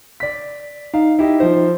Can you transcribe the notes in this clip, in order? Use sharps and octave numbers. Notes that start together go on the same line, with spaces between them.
D5 B6
D#4 F5
E4 G4 D#5
F3 C5